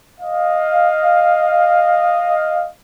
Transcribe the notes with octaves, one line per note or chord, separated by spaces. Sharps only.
D#5 F5